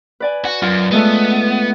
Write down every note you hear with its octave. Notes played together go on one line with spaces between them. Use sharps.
B4 D5 G#5
F#4
F#2 F4
G#3 A3 B3 A4